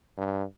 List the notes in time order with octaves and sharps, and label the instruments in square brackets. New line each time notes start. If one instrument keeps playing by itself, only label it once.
[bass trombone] G2